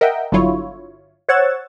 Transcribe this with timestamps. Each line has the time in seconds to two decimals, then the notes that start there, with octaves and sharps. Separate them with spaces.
0.01 A#4 D#5 E5 F#5 G5
0.32 G1 D3 F#3 E4 F4 C#5
1.29 C5 C#5 F#5 E6 G#6 A6